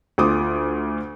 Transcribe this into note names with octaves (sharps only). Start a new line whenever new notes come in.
D2 F4 D6 D#6